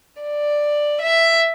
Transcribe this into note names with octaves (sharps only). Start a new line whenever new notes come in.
D5
E5